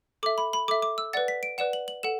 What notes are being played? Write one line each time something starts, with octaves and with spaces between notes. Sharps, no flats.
A4 E5 D6
B5
B5
A4 E5 D6
D6
E6
B4 D5 F#5 A6
B6
D7
B4 D5 F#5 E7
F#7
F#7
A4 F#5 E7